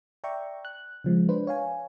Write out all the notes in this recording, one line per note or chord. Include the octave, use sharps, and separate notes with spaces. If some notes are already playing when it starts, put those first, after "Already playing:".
D5 E5 G5 A#5 C#6
F#6
C#3 F3 G#3
D4 B4 C5
C#5 F5 G#5